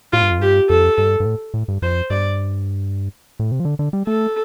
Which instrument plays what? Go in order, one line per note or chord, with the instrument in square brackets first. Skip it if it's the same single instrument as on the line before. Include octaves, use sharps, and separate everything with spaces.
[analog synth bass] A2 [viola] F4
[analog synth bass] G2
F2
[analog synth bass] G2 [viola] G4
[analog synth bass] F2 [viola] A4
[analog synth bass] G2
G2
A2
A2
G2
[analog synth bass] F2 [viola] C5
[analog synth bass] G2 [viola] D5
[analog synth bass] A2
C3
F3
D3
D3
G3
[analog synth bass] A3 [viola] A4